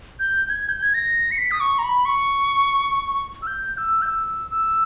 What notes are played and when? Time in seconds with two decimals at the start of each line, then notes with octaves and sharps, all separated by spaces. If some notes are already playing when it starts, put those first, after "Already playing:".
0.20 G6
0.50 G#6
0.69 G6
0.82 G#6
0.94 A#6
1.32 C#7
1.38 B6
1.51 D#6
1.60 C#6
1.79 A#5
1.84 B5
2.05 C#6
3.42 E6
3.47 G6
3.78 E6
4.02 G6
4.07 E6
4.51 E6